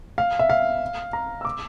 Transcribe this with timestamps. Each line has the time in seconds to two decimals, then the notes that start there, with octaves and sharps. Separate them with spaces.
0.18 F5
0.39 E5
0.50 F5
1.13 A#5
1.41 E6
1.45 D6